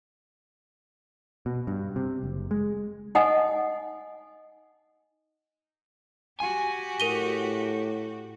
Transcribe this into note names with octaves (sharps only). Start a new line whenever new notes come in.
B2
G2
C3
F#1
G#3
D#4 D#5 F#5 G#5 D#6
F#4 G4 G#5
A2 A#4 D#7 G7